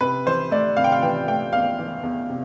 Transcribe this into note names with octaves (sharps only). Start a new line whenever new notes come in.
C3 B4
E3 C5
A3 D5
C3 F5
G5
F5
E3 G5
A3 G5
E2 F5
E3
E2
C3